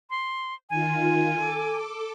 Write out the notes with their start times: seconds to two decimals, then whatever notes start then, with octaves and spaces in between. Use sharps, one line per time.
0.10 C6
0.70 D#3 F4 G#5
1.34 A4 D6